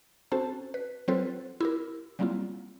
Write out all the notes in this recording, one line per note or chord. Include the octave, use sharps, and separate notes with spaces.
C4 C#4 F#4 A4 C5 A5
B4
F#3 C4 F4 A4 B4 C5
E4 G4 A#4
F#3 G3 A#3 C4 E4 F4